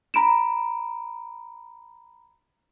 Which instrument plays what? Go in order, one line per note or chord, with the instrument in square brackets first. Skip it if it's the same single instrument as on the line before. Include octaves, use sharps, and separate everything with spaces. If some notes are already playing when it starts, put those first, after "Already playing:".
[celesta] A#5 B5 D7 E7